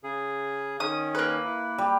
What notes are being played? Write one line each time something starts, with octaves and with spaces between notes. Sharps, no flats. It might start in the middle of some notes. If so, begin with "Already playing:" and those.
C#3 G#4
D#3 C#4 D#6
A#3 B4
E4
G3